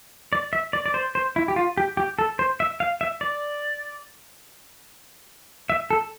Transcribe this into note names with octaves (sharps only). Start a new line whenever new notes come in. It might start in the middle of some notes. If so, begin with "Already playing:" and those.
D5
E5
D5
D5
C5
C5
E4
G4
F4
G4
G4
A4
C5
E5
F5
E5
D5
E5
A4